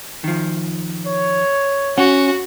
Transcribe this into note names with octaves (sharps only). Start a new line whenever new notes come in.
D#3 F3
C#5
C#4 F#4 F#5